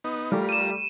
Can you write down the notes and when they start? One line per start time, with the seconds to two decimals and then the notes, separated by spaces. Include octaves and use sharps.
0.04 B3 D#4
0.32 G3 A3 F4 G4 A#4
0.49 D#7 E7